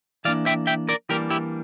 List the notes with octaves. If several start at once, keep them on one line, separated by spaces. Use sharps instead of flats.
E3 A#3 D4 D5 F5
E5 G5
E5 G5
A#4 D5
E3 G3 A#3 D4 G4 A#4
E4 G4